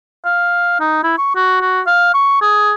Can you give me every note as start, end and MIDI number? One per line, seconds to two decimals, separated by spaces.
0.25 0.79 77
0.80 1.03 63
1.04 1.14 64
1.18 1.34 85
1.35 1.60 66
1.61 1.81 66
1.87 2.09 77
2.14 2.40 85
2.42 2.74 68